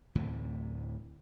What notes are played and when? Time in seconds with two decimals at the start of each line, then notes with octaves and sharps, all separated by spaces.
0.15 D2 A2 C3 E3